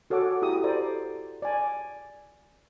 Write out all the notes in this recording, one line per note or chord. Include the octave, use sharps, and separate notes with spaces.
F#4 A4 C#5 F#5 D6
E4 F#4 G4 A#5 D#6
A4 C5 D5 A#5
D5 G#5